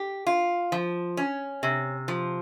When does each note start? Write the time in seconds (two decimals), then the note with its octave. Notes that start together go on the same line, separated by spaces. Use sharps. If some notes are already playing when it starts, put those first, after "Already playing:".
Already playing: G4
0.27 F4
0.72 F3
1.17 C#4
1.63 C3
2.08 F3